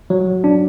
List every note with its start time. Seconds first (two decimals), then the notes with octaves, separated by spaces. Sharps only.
0.10 F#3
0.44 D4